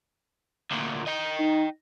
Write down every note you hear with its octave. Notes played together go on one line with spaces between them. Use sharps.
D2 A#2
D#5 G5
D#4